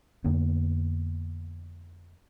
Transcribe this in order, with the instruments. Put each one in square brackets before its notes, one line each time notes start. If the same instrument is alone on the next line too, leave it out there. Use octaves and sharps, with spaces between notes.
[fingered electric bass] F2 D3 A#3 B3